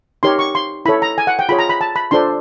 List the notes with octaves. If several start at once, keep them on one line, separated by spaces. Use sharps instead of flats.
D#4 G4 A#4 C#5 C6
C#6
C6
E4 A4 C#5 B5
A#5
G#5
F#5
G5
F4 G#4 C#5 B5
A#5
B5
A5
B5
D4 F4 A4 C5 C6